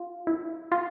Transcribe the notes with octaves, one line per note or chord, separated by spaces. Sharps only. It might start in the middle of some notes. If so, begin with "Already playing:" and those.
Already playing: F4
E4
F4